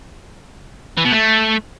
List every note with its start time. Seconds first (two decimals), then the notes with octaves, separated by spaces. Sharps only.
0.98 E3
1.05 B2
1.13 A3